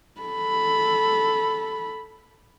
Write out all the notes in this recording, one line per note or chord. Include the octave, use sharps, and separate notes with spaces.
A4 B5